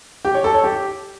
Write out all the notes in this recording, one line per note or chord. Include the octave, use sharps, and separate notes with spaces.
G4
C#5
A4
C#5
G4